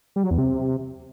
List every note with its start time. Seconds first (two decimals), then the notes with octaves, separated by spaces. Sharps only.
0.16 G3
0.23 F#3
0.31 E2
0.38 C3